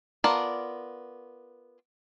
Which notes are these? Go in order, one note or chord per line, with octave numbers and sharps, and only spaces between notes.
B3 F4 A#4 D5 A5